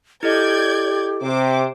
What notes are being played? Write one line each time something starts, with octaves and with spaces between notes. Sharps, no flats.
E4 G4 A4 D5 D#5 G6 G#6
C3 C5 D6